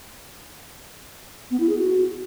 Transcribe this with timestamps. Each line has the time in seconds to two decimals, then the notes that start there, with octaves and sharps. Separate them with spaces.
1.51 B3
1.60 E4
1.69 G#4
1.78 F#4